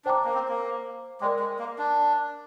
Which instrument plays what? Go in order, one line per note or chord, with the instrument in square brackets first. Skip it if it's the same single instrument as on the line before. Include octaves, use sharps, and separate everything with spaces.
[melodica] D4 [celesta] C5 G5 A#5 D6
[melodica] A#3
C4
A#3
[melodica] G#3 [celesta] A#4 D5 G5 D6
[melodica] G#3
A#3
D4